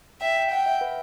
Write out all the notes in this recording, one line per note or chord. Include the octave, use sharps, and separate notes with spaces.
E5 G5
G5
F#5 G5
E5
B4